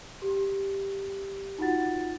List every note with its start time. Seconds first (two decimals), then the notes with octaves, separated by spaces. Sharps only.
0.22 G4
1.58 D#4 F4 F#4 F#5 A6